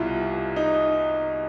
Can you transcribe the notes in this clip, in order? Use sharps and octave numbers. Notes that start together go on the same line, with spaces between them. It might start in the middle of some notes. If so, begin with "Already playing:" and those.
Already playing: C2 B2 E4 F4
D#4